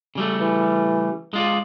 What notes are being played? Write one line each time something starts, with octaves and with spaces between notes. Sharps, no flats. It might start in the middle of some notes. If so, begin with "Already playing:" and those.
C#3 G3 A3
E3
G#3 F4 D5